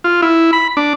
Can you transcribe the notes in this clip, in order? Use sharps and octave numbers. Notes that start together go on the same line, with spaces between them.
F4
E4
B5
D4